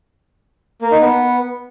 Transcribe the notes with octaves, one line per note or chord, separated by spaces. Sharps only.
A#3
D#4
B3